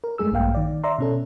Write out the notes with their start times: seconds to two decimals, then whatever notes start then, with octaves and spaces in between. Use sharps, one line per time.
0.04 A#4
0.18 F#2 G#3 A3 G#4 E6
0.32 A#1 G2 A#3 F5 G5
0.55 D#3 D5
0.84 D5 E5 A#5 C6
0.99 B2 C#4 A4